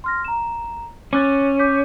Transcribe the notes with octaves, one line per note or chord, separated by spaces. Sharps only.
C6 F6 A#6
A#5 E7
C#4 D6 F#6 A6
D6 G6 B6